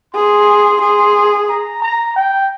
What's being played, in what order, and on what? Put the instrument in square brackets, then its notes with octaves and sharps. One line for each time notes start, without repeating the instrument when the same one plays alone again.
[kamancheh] G#4 [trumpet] C6
[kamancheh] G#4
[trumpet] A#5
A#5
G5